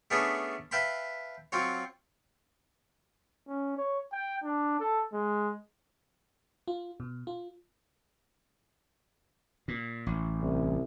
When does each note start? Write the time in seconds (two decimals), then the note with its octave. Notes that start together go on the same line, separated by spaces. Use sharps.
0.11 A3 B3 C#4 D4 G#4 B4
0.71 B4 E5 F5 G5 A5 B5
1.52 F#3 C4 F4 F#4 C#5
3.48 C#4
3.78 C#5
4.12 G5
4.43 D4
4.80 A4
5.13 G#3
6.68 F4
7.00 B2
7.27 F4
9.68 A#2
10.07 A1
10.41 C2